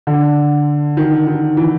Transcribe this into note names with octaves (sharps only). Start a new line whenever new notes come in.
D3
D#3
D#3
E3